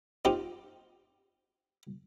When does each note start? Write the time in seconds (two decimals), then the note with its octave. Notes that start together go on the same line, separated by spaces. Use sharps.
0.25 C4 D#4 F4 G4